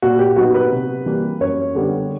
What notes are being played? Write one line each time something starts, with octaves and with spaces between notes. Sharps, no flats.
A#2 F#4
G4
F#3 B3 D#4 F#4
B4
C3
E3 G3 A#3
F#2 C#5
D3 G3 B3 D4